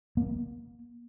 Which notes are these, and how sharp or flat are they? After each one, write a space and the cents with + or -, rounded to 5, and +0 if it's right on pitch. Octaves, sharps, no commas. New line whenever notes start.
A#3 +35